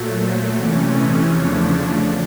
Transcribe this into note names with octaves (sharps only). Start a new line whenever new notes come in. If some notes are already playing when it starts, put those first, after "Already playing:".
Already playing: A#2 F#3 A3
C5
C3 E3 A3 C#4 D5
D#5
E2 C#3 F3 A3 D4 C#5